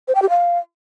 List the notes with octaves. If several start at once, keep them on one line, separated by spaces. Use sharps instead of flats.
C5
G5
G4
F5